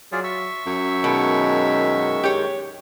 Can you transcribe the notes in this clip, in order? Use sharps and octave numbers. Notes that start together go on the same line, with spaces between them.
F#3 F4 G#4 D5
E5 C#6 E6
F#2
B2 D#3 G#3
G4 C#5